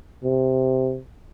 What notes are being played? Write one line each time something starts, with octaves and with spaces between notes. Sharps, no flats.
C3